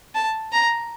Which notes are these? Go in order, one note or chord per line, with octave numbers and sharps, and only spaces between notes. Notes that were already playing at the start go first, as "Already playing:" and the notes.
A5
A#5